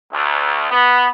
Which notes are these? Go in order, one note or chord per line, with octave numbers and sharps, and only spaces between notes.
D2
B3